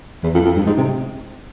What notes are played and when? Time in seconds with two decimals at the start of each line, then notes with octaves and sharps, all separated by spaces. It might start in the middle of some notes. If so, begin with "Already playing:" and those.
0.23 E2
0.34 F2
0.44 F2
0.56 G2
0.66 G#2
0.77 C3